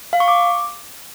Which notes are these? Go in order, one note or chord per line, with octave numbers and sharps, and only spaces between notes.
F5
C#6
D6